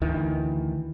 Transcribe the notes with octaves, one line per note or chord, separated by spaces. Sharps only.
D2 D#3 E3